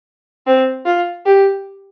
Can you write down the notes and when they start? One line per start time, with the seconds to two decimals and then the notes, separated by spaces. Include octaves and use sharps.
0.47 C4
0.86 F4
1.26 G4